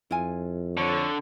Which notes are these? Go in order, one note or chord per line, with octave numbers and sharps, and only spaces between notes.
F2 E4 F4 G#5
D3 C#5